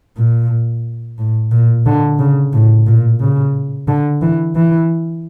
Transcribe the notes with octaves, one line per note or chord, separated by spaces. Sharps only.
A#2
A2
A#2
D3
C#3
A2
A#2
C#3
D3
E3
E3